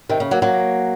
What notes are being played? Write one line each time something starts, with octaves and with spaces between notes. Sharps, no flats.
C3 D#3
C#3
F#3 A#3
F#3 A#3